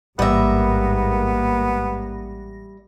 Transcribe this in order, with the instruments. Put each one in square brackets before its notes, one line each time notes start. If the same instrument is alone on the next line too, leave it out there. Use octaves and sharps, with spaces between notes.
[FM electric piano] A1 A#6 [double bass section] G#2 A#3 [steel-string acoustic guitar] G3 E5 [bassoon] B3